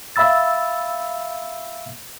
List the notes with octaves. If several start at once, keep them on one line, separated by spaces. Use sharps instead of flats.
E5 F5 B5 E6 A6